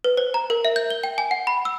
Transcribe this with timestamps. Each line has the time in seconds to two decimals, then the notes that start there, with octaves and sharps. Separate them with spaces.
0.04 B4
0.17 C5
0.34 A#5
0.50 A#4
0.65 E5
0.76 G6
0.90 G7
1.04 G5
1.18 G#5
1.31 F#5
1.47 B5
1.65 E6